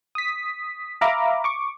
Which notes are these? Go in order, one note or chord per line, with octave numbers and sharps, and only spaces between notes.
D#6 B6
E5 F5 A#5 B5 D6
C#6 D6